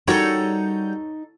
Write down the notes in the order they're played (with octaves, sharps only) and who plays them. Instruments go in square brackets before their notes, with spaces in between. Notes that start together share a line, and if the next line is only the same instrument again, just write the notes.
[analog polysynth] G3 G6 [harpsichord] C#4 F#4 A#4 [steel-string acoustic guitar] D#4 [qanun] A4 C#5